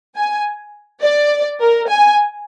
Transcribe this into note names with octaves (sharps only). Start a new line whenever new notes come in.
G#5
D5
A#4
G#5